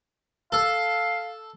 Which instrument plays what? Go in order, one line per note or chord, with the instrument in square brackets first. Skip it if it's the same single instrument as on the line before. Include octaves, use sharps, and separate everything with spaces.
[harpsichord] A4 [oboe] F5